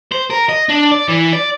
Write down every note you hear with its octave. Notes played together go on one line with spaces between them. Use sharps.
C5
A#4
D#5
D4
D5
E3
D5